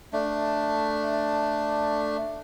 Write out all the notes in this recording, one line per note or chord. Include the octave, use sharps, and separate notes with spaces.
A3 D4